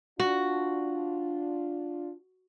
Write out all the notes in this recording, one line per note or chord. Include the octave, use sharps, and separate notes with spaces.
D4 F4 F#4